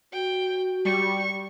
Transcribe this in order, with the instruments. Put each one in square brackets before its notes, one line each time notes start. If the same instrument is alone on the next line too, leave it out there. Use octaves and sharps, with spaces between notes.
[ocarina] F#4 [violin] G5
[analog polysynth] G3 [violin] C#6